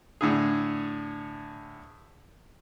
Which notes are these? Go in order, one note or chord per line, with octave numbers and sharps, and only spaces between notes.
A2 D3 G#4